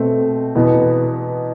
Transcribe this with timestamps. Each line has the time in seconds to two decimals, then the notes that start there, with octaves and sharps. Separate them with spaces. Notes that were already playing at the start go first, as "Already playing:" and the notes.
Already playing: B2 A3 C4
0.55 E2 B2 B3